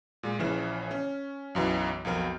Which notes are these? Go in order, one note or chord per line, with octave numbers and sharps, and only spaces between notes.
A#2 G#3
A#1 C#3 E3 F6 E7
C#4
B1 F#2 E3
B1 F2 A#4 F6